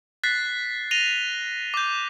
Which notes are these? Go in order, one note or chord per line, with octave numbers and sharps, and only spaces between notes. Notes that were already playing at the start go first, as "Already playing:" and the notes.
F#6 A6 B6 C7
A#6 D#7 F7 G7
D6 G6